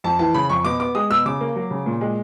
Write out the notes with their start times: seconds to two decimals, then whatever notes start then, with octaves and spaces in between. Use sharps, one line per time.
0.04 F2 A5
0.19 E3 A5
0.34 C#3 B5
0.49 F2 C#6
0.64 B2 D6
0.80 B3 D6
0.95 G#3 D#6
1.10 B2 E6
1.26 C#3 D6
1.41 A#3
1.56 F#3
1.71 C#3
1.86 A#2
2.01 G#3